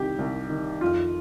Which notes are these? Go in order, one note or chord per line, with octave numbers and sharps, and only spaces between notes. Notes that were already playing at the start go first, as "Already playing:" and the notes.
Already playing: C2 D#3 G4
C2
D#3
F2 F4